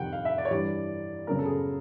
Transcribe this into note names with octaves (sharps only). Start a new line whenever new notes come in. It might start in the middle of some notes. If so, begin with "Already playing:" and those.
Already playing: F2 C3 D#3 F#5 G5
F5
E5
D5
C#5
G2 E3 G3 D5
F#2 C#3 F#3 B3 A#4
A4
G#4